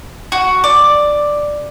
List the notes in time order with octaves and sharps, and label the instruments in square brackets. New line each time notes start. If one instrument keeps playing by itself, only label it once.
[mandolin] F#4
D5